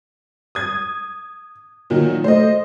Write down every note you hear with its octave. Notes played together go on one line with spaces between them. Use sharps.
D#6 G#6
A#2 D#3 F#3
A3 C5 D#5